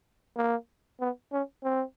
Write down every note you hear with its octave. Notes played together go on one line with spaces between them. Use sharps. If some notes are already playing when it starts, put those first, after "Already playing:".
A#3
B3
C#4
C4